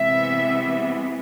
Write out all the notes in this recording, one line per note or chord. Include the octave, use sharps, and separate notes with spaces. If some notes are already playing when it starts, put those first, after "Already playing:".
Already playing: C3 E3 G#3 B3 E5